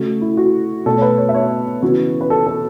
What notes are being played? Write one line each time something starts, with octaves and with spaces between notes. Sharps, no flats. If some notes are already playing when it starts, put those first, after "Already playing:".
Already playing: C#3 A3 F#4
E4
F#4
B2 A3 A4
C#5
B4
C#5
E5
C#5
C#3 E3 B3 F#4
B4
A4
A4